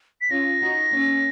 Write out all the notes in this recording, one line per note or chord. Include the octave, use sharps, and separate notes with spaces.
B6
C#4 F4 A#6
D#4 F#4
A#3 C#4